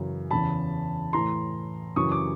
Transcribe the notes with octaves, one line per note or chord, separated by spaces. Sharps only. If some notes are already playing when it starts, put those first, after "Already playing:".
Already playing: F#2 C#3 E3
E2 C#3 E3 A5 B5
A2 E3 A#5 C6
F#2 C#3 E3 C#6 D#6
D6